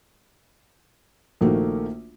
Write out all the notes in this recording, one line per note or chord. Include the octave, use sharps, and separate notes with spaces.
A#1 D#3 A3 A#3 F#4